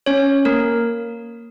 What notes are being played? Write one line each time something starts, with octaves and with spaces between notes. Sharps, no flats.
C#4 C#5
A#3 A#4